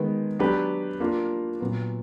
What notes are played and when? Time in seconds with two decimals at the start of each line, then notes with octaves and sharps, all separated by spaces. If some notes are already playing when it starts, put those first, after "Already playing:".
Already playing: D#3 G#3 B3
0.39 F#3 B3 D4 G4 B4
1.00 A#3 D4 F4
1.61 A#2 F#3 B3